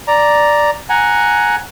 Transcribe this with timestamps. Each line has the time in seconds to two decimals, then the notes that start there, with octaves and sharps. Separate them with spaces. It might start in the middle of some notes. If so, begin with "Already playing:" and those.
0.08 D5 A#5
0.90 F#5 G#5 A#5